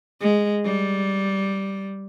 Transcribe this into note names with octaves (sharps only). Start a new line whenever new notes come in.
G#3
G3